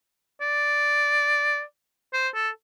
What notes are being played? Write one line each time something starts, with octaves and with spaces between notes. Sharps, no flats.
D5
C5
A4